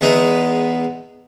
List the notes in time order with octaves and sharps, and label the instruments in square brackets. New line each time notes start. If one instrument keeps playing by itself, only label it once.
[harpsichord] E2 E3 G#3 B3 D#4